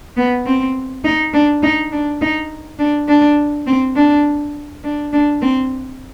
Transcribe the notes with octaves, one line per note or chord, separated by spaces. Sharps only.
B3
C4
D#4
D4
D#4
D4
D#4
D4
D4
C4
D4
D4
D4
C4